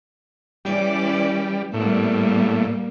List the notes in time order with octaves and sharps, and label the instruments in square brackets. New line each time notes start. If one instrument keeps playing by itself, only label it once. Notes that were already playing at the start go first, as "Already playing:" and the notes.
[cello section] E3 C#4 D5 [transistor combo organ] G3
[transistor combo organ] A2 [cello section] G3 A#3 B3